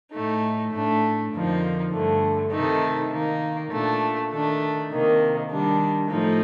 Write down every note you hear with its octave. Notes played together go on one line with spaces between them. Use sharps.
A2 A3 D#4
A2 A3 D4
F2 D3 F3 A#3 D#4
G2 D3 A3
C3 D#3 A3 D#4
D#3 A#3 D#4
A#2 A3 D4
D#3 A3 D4
C3 D#3 A#3
D#3 G3 D4
A2 F3 A3 D#4